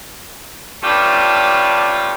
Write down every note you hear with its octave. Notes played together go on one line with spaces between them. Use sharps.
G2 A3 C#4 D4 F4 G4